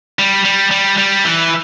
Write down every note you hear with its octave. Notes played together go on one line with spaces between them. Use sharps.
G3
G3
G3
G3
E3